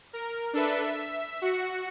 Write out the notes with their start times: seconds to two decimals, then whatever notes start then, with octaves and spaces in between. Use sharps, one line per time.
0.13 A#4
0.53 D4 A4 B4 E5
0.83 E5
1.42 F#4 C#7